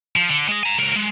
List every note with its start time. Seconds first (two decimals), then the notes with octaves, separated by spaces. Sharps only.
0.16 F3
0.30 D3
0.49 G#3 D#5
0.63 G#5 A#5
0.79 C#2 A#4
0.96 G#3